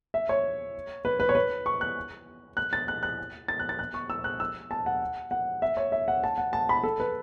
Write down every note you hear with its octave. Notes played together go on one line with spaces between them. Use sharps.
E5
C#5
B4
B4
C#5
B4
C#6
F#6
F#6
A6
F#6
F#6
A6
F#6
A6
F#6
C#6
E6
F#6
E6
A5
F#5
F#5
E5
C#5
E5
F#5
A5
F#5
A5
B5
A4
B4